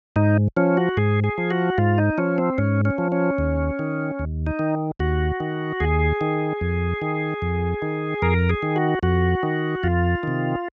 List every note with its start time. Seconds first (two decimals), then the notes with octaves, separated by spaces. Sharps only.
0.16 G#2 D#4
0.57 F3 C#4
0.77 F#4
0.97 G#2 G#4
1.24 G#4
1.38 F3
1.51 F#4
1.78 G#2 F4
1.98 D#4
2.18 F3 C#4
2.38 C4
2.58 G#2 C#4
2.85 C#4
2.98 F3
3.12 C#4
3.38 D#2
3.79 D#3
4.19 D#2
4.47 D#4
4.59 D#3
5.00 D#2 F#4
5.40 D#3
5.80 D#2 G#4
6.21 D#3
6.61 F2
7.02 D#3
7.42 F2
7.82 D#3
8.22 F2 A#4
8.49 G#4
8.62 D#3
8.76 F#4
9.03 F2 F#4
9.43 D#3
9.83 F2 F4
10.23 C3 D#3